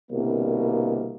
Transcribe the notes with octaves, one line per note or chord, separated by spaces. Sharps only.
C2 B2 D3 A#3